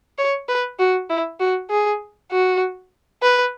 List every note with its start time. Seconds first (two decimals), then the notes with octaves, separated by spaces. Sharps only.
0.18 C#5
0.49 B4
0.79 F#4
1.09 E4
1.40 F#4
1.70 G#4
2.31 F#4
3.23 B4